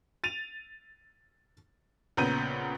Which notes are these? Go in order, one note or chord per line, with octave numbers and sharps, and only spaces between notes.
A6 D#7 F7
A#1 C#3 B3 A#5 G6 D#7